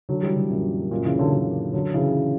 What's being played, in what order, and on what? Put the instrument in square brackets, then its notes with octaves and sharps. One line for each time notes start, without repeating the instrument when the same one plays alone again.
[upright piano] D3 F#3
E3 G3
D3 F#3
F#2 A#2
F#2 A#2
C#3 E3
D3 F#3
D3 F#3
D3 F#3
C#3 E3